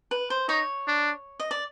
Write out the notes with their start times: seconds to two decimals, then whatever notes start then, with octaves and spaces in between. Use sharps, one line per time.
0.11 B4
0.30 C5
0.49 D#4 C#5
0.88 D4
1.40 D#5
1.51 D5